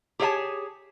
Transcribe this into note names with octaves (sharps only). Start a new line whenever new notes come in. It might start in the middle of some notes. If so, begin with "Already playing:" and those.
G4 G#4 C#5 E5 G#5 A5